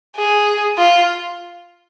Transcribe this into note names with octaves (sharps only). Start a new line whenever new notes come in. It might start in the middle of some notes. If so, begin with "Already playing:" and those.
G#4
F4